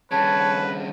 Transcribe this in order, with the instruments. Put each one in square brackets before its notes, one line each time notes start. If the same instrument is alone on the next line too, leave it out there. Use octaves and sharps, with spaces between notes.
[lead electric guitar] G2 C#3 [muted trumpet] B4 [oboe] C#5 [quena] A5